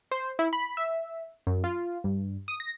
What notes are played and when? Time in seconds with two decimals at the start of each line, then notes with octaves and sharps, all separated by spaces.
0.11 C5
0.39 E4
0.53 B5
0.77 E5
1.47 F#2
1.64 F4
2.04 G2
2.48 D#6
2.60 A#6